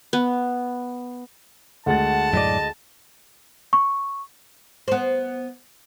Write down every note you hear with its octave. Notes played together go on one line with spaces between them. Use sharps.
B3
D2 G#3 F#5 A5 A6
F#2 A2 D5 D#5
C#6
B3 C5